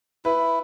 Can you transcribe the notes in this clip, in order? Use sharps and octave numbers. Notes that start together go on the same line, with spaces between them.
E4 B4